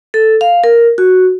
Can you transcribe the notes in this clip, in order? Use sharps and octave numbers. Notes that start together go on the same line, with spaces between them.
A4
F5
A#4
F#4